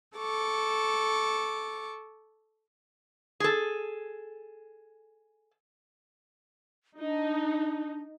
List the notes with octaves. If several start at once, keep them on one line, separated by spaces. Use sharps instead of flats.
A4 C#6 D6
G#4 A4
D4 D#4